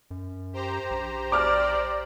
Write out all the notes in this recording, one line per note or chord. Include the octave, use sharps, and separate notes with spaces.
F#2
G4 C5 A#5
A#1
D5 D6 F6